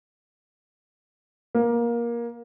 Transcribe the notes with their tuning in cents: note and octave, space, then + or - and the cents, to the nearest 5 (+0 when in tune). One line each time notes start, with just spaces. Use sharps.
A#3 +20